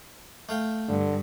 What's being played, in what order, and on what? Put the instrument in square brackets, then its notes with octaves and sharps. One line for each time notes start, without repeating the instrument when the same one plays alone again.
[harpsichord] A3 F5 G5
[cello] G2 [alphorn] D3